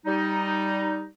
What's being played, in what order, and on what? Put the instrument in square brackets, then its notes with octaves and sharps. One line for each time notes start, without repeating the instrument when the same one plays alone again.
[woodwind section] G3 D#4